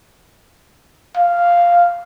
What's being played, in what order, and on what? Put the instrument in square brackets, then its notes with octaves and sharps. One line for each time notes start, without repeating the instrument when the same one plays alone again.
[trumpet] F5